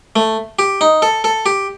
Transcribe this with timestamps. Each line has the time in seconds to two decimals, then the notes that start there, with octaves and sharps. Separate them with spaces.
0.16 A3
0.59 G4
0.81 D#4
1.02 A4
1.24 A4
1.46 G4